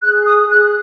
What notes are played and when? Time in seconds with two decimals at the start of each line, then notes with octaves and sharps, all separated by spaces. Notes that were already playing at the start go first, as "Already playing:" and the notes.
0.03 G#4 F#6
0.26 D#6
0.49 G#4 F#6